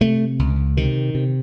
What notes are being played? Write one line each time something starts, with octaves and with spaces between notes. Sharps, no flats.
C3 A3
C#2
C3 D#3
C3